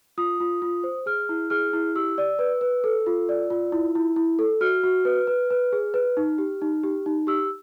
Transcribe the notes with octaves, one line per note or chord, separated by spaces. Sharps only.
F4 D#6
F4
F4
C5
G#4 F6
E4
G#4 F6
E4
G4 E6
D5
B4
B4
A4
F4
D5
F4
E4
E4
E4
A4
F#4 F6
F#4
B4
B4
B4
G#4
B4
D#4
G4
D#4
G4
D#4
G4 E6